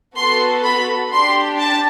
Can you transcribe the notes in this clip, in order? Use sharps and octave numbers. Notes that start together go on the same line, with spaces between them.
B3 F#4 A4 C6
B5
D4 G4 C6
A5